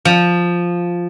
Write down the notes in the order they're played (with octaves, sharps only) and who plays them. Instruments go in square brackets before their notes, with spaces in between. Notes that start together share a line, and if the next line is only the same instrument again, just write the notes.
[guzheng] F3